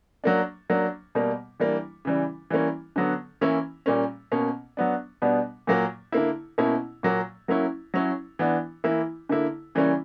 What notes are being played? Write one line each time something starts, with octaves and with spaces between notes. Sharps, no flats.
F#3 A#3 D4
F#3 A#3 D4
B2 G3 A#3
E3 G3 A#3 D4
C#3 E3 G3
E3 G3 A#3 C#4
D3 F#3 B3
E3 A#3 C#4 E4
A#2 G3 A#3 C#4
B2 A#3 C#4
F#3 B3 D4
B2 G3 B3 D4
A#2 F#3 A#3
D3 A#3 E4
B2 A#3 C#4 E4
A#2 F#3 A#3
F#3 A#3 C#4 E4
F#3 C#4 E4
E3 B3 D4
E3 A#3 E4
D3 A#3 E4
C#3 E3 G3 A#3 C#4